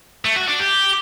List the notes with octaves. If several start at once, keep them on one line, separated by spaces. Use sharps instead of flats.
A3
F#4
D4
G4